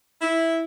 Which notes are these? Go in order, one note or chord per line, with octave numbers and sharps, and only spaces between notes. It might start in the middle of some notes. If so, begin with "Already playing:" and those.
E4